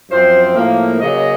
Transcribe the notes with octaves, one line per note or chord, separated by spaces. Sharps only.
F#2 F3 C4 C5
A2 F3 A#3
C#3 F#3 A#3 D#5